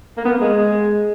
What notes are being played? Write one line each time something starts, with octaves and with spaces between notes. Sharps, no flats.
A#3
B3
A#3
G#3